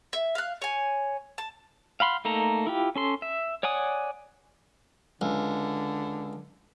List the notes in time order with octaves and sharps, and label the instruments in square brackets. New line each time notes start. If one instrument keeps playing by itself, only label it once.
[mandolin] E5
F5 F#6
C#5 G#5
A5
[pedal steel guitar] F5 F#5 B5 C6
A3 A#3 D#4 A4 A#5
E4 F4 G4
C#4 A4 C6
E5
C#5 D5 F#5 G#5 D#6
[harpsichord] C#2 [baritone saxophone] D3